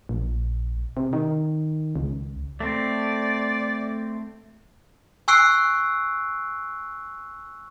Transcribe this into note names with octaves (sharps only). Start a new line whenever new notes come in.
A#1
C3
D#3
C#2
A3 C4 D5
G#5 C#6 E6 F#6 C7 D7